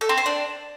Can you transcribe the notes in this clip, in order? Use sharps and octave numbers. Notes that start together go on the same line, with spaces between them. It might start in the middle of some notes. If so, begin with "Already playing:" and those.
A4
C4
C5
D4